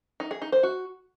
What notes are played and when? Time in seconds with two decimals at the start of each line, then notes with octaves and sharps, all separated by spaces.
0.20 D#4
0.31 G#4
0.42 D#4
0.52 C5
0.63 F#4